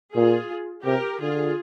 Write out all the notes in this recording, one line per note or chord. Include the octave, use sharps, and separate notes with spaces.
A#2 F4 G#4
C3 G4 A#4
D3 F4 G#4